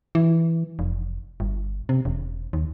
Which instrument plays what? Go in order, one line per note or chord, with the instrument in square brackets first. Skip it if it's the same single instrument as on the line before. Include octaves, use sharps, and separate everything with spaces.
[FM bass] E3
F1
G1
C3
E1
D#2